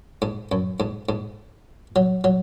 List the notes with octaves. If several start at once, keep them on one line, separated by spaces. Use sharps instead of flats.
G#2
F#2
G#2
G#2
F#3
F#3